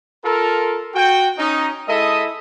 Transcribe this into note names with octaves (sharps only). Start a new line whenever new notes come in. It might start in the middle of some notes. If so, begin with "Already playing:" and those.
F4 A4 A#4
F#4 G5
C#4 D#4
G#3 E4 A4 D#5 E5 D#6